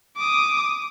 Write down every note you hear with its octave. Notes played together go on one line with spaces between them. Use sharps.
D6 D#6